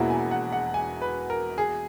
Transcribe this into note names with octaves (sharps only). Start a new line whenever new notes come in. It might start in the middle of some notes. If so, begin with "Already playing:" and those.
Already playing: E1 E2 B2 A#3 E4 F#5
G#5
F#5
F#5
G#5
B4
A#4
G#4